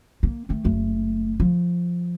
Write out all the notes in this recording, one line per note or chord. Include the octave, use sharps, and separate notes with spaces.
A#3
D#3 A3
F#1 A3
F3